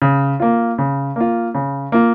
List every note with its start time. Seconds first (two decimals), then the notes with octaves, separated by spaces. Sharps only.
0.02 C#3
0.40 A#3 F4
0.78 C#3
1.16 A#3 F4
1.55 C#3
1.92 A#3 F4